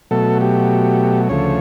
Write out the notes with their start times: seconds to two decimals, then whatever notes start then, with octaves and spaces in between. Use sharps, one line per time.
0.11 B2 F#3 A3 A4
0.41 G4
1.29 D2 C#3 F3 A3 C#5